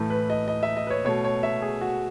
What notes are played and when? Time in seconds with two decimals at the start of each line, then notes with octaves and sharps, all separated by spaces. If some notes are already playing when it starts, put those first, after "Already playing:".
Already playing: A2 E3 A3
0.10 B4
0.30 D#5
0.48 D#5
0.63 E5
0.77 D#5
0.87 B4
0.90 C#5
1.05 B2 A3 C#5
1.25 C#5
1.43 E5
1.62 G#4
1.81 F#4